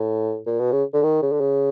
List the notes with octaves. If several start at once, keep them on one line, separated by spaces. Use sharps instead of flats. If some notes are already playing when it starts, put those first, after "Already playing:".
Already playing: A2
A#2
B2
C#3
D3
D#3
C#3
D3
C#3